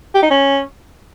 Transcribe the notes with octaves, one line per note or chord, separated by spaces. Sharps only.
G4
D#4
C#4